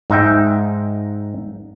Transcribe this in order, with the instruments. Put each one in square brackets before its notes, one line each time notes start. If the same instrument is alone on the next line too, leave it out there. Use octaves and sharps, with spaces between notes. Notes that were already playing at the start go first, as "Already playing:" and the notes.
[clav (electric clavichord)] G#2 D#4 E5 G5